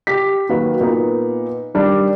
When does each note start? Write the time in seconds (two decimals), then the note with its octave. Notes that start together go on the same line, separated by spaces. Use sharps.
0.07 G4 B6
0.49 D#3 F#3 A#3 F#4 B4
0.81 A#2 B3 D#4
1.74 D#3 G3 D4